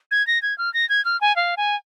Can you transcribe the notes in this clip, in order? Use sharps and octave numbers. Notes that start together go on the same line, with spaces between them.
G#6
A#6
G#6
F6
A#6
G#6
F6
G#5
F5
G#5